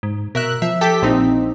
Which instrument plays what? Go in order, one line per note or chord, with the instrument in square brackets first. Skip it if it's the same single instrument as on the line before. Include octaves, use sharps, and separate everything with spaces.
[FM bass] G#2
[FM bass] B2 [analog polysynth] A#4 E5 F#6
[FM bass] F3 [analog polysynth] E5
[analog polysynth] G4 A4 B6
A#1 C4 D#4